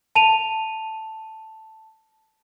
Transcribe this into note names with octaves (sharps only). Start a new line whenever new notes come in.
A5 D#7 F7